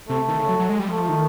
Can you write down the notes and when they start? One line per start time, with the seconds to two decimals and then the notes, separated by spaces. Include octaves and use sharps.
0.09 C3 A3
0.28 D#3
0.39 C#3
0.49 F#3
0.59 F#3
0.69 G#3
0.80 G3
0.89 F3 A3
1.09 D#3